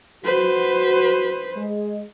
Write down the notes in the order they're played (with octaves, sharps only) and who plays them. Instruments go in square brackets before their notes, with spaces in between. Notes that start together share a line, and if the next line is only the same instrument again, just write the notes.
[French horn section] F#4 [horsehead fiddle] B4 C5
[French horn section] G#3